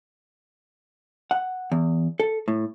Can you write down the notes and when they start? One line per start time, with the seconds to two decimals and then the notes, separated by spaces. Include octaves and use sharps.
1.31 F#5
1.72 E2
2.20 A4
2.48 A2